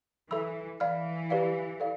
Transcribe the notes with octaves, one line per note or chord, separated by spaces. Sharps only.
E3 A4 E5 B5 E6
E3 D5 F5 B5 F6
G4 B4 D5 F5
A4 D5 F5